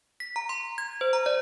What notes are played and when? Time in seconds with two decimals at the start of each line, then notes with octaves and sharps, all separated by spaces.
0.20 B6
0.36 A#5
0.49 C6
0.78 G#6
1.01 C5
1.13 A#5
1.26 D5